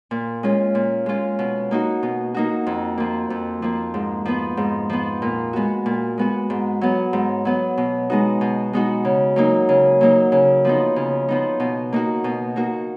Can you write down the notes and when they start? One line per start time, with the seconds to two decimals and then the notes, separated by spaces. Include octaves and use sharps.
0.11 A#2
0.43 G#3 C#4 F4
0.75 A#2
1.06 G#3 C#4 F4
1.39 B2
1.71 A#3 D#4 F#4
2.03 B2
2.34 A#3 D#4 F#4
2.66 F2
2.98 F3 A#3
3.30 F2
3.62 F3 A#3
3.94 G#2
4.25 F3 B3
4.57 G#2
4.90 F3 B3
5.22 A#2
5.53 G#3 B3 F#4
5.86 A#2
6.18 G#3 B3 F#4
6.50 G#2
6.81 F#3 B3
7.13 G#2
7.45 F#3 B3
7.78 B2
8.10 G#3 B3 D#4 F#4
8.41 B2
8.73 G#3 B3 D#4 F#4
9.05 C#3
9.36 F#3 A#3 D#4
9.69 C#3
10.01 F#3 A#3 D#4
10.32 C#3
10.65 F3 B3 D#4
10.96 C#3
11.29 F3 B3 D#4
11.60 B2
11.92 A#3 D#4 F#4
12.24 B2
12.56 A#3 D#4 F#4